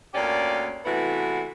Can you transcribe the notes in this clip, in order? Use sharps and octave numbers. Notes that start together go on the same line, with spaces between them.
D2 A#3 C#4 G4 D5
C3 E3 A3 B3 E4 F#4